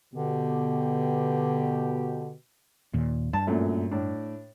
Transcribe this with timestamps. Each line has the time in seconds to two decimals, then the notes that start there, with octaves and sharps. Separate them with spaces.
0.14 B2 D3 G4
2.94 D#2 A#2
3.33 G2 A5
3.47 F#2 A#2 A3
3.91 A2 D4